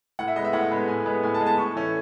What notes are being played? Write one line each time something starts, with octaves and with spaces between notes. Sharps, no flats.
A2 F#5
E5
G#3 B3 D#5
E5
A2 F#5
G#3 B3
A2 G#5
G#3 B3
A2 G#5
A5
G#3 B3
A5
A2 C#6
E3 A3 C#4